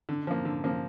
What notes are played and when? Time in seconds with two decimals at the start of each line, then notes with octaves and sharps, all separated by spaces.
0.09 D3
0.27 F3 A#3
0.45 D3
0.64 F3 A#3